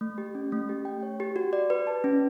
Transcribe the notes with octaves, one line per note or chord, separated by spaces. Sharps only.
A3
G4
C#4
A3
G4
G5
C#5
G4
F#4
D5
B4
A5
C#4